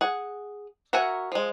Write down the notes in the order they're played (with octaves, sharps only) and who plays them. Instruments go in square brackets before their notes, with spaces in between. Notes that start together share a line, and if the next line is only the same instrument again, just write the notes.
[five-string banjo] G#4 F#5
F#4 A#4 E5 F#5 G#5
F3 G#3